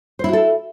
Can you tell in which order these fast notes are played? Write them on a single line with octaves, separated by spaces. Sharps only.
C5 E4 F#4 A4